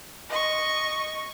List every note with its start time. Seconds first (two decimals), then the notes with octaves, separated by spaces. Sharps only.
0.29 D#5 C#6